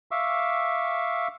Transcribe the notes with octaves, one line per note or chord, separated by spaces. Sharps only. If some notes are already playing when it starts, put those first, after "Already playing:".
E5 F5 C#6 D6 E6